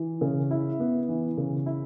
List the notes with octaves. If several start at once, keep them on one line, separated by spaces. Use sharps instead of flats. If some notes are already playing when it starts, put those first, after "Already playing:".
Already playing: E3
C#3
E4
B3
E3
C#3
E4